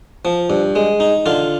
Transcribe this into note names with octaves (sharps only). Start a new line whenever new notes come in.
F3
G2
G#3
D#4
D3 F4